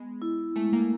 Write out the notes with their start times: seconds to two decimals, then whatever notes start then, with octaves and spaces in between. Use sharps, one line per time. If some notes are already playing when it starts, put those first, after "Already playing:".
Already playing: G#3 B3
0.22 E4
0.56 G#3 A3
0.73 A#3